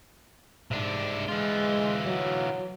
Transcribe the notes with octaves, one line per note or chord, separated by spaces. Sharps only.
G#2 C3 D4
E3 G#3 F4
F#3